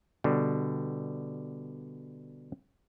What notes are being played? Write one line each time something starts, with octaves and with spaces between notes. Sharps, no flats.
B2 D3 G3